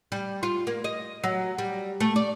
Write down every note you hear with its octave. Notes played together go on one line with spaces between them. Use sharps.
G3
F4
A#3
D#5
F#3
G3
A3
D5